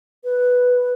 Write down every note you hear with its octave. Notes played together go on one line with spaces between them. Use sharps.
B4